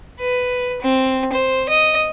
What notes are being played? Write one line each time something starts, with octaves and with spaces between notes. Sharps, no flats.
B4
C4
C5
D#5